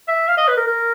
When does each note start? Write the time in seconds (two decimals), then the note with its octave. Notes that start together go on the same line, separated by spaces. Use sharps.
0.08 E5
0.28 F5
0.37 D#5
0.48 B4
0.57 A#4
0.67 A#4